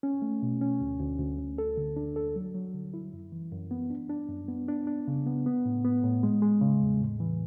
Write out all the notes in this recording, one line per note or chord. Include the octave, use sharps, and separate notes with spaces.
C#4
A3
B2
C#4
D2
D2
D2
D2
A4
D3
D4
A4
F#3
F#3
D3
E4
F#2
E3
F#2
B3
D4
D4
F#2
B3
D4
D4
C#3
B3
B3
A2
B3
A2
G#3
G#3
C#3
E2
A2
E3